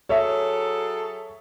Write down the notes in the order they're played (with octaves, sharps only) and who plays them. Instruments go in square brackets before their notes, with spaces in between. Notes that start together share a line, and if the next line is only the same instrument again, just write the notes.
[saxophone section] F#3 G#4 A4 [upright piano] C#5 E5